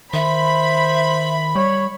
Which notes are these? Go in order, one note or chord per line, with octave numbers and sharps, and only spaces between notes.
D#3 C5 E5 B5
G3 C#5